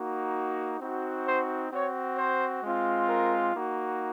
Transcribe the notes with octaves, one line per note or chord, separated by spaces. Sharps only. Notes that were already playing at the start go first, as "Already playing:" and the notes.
Already playing: A#3 D#4 F#4
C4 D#4 F#4
C5
C4 F#4 C#5
C5
G#3 C4 F4
A#4
A#3 D#4 F#4